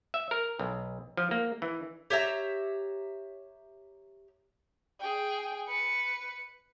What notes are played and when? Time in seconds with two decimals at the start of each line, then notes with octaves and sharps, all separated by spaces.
0.14 E5
0.31 A#4
0.59 B1
1.17 F3
1.31 A#3
1.62 E3
2.10 G4 C#5 E5 A#5
5.00 G#4 G5
5.67 B4 C#7